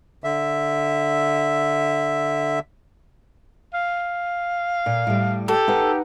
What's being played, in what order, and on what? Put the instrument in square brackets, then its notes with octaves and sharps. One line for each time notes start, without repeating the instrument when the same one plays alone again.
[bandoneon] D3 E5
[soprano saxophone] F5
[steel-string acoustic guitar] A#2
A2 G3
[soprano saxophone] G4 [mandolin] A4
[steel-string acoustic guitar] D#4 B4 F#5